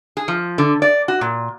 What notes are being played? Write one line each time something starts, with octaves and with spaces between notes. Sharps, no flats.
G#4
F3
D3
D5
F#4
A#2